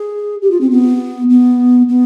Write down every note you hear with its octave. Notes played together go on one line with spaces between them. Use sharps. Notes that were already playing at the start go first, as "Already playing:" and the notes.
Already playing: G#4
G4
F4
C4
B3
B3
B3